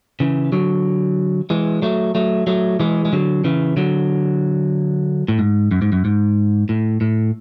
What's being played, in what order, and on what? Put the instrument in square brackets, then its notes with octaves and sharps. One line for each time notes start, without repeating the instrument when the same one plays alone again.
[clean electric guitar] C#3 E3
D3 F#3
E3 G#3
F#3 A3
F#3 A3
F#3 A3
E3 G#3
G#3
D3 F#3
C#3 E3
D3 F#3
A2
G#2
F#2
G#2
F#2
G#2
A2
A2